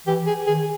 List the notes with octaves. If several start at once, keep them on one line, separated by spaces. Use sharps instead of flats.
E3 G4
G#4
D#3 G#4